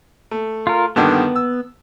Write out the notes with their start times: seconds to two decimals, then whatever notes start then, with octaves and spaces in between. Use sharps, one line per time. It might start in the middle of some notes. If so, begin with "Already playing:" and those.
0.31 A3
0.67 F4 A#4
0.96 G2 D3 D#3 B3
1.36 E6